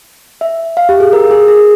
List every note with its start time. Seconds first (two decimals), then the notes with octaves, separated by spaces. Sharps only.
0.41 E5
0.77 F5
0.89 G4
1.00 G#4
1.13 A#4
1.31 G#4
1.48 G#4